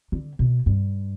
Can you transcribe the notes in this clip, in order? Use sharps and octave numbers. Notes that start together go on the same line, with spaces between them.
D3
B2
G2